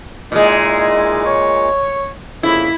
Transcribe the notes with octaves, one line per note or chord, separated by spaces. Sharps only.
A#2 G#3 D#4 E4 G#4
C#5
F2 C#3 A#3 E4